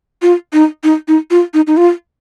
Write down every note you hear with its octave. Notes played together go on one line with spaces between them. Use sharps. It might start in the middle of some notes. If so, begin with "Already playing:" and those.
F4
D#4
D#4
D#4
F4
D#4
D#4
F4